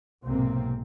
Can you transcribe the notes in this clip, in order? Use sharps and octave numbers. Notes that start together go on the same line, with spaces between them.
B1 G#2 C3 A#3 C4